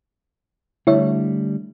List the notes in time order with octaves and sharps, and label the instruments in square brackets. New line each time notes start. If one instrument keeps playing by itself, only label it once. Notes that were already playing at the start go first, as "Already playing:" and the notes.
[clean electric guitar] D3 G3 A3 [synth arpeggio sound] E4 C#5 E5